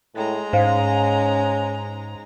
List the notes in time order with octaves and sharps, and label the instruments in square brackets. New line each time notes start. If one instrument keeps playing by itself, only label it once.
[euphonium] A2 [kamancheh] G#3 A#5
[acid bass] G#2 [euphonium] C#4 [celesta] C5 F5